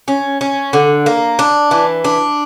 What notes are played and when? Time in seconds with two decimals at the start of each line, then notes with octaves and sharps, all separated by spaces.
0.08 C#4
0.41 C#4
0.73 D3
1.06 A#3
1.39 D4
1.71 E3
2.05 D4